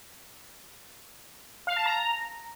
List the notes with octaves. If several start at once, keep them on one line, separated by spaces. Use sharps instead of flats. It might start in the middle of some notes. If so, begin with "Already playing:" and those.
F5
A5
A#5